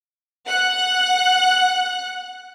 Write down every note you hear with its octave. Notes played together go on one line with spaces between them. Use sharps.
F#5 F#6